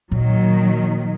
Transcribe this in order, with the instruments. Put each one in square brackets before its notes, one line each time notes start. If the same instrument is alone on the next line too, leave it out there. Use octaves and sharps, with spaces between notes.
[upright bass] A#2 [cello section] D#3 F#3